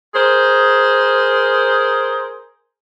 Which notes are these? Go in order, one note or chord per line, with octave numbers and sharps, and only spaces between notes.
G#4 A#4 C5